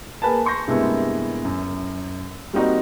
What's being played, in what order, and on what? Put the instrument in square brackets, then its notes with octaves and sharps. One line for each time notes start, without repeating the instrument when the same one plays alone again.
[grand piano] A#3 G#4 A#4 B4 G#5 A5
C6 C#6 G6 A#6
G2 C3 G#3 A#3 B3 E4
F#2
G3 A#3 C4 D#4 F#4